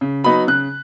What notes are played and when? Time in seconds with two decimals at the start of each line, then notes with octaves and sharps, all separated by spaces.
0.01 C#3
0.24 F#3 B3 D#4 B5
0.47 C#3 F#6